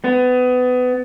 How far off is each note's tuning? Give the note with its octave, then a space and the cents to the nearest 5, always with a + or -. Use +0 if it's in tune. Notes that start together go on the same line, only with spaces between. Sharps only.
B3 +25